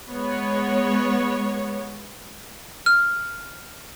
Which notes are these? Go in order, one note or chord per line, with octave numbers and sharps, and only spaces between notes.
G#3 B3 C#5
F6